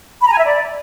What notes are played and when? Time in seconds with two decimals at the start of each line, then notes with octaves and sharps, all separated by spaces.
0.20 B5
0.26 A#5
0.32 G#5
0.38 E5
0.44 D5